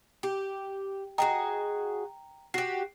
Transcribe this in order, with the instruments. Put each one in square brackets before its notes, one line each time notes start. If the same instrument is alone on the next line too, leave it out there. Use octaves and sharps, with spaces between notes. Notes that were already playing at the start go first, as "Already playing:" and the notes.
[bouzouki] G4
[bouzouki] F#4 G#4 D#5 [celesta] G5 A#5
[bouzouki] F#4 G4 [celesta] C7